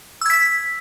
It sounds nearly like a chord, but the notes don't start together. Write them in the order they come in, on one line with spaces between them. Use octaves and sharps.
E6 G#6 B6